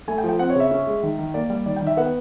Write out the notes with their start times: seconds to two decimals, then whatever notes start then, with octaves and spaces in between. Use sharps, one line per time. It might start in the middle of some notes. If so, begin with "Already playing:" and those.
0.08 A3 G#5
0.18 G5
0.24 F3
0.29 G5
0.39 C4 F#5
0.50 C#5
0.55 C#3 E5
0.71 C#4
0.87 G#3
1.03 D#3
1.18 D#3
1.34 A#3 D5
1.50 G3
1.66 D#3 D5
1.76 G5
1.82 D#3 E5
1.97 B3 F#5